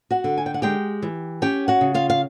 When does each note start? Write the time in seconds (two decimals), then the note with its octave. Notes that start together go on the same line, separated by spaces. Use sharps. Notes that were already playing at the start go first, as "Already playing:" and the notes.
0.11 F#4 F#5
0.24 D3
0.38 G#5
0.46 G5
0.54 F#5
0.62 G#3 G4 G5
1.02 E3
1.42 C#4 G4 G5
1.68 F#4 F#5
1.81 C#3
1.94 F4 F5
2.10 F5